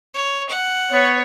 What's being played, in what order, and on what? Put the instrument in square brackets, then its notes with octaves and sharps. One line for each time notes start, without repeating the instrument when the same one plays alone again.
[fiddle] C#5
F#5
[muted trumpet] B3 [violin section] C#5